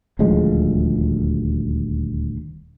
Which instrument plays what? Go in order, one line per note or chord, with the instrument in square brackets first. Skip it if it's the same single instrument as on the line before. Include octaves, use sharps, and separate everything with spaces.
[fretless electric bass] D#1 D2 F3 G#3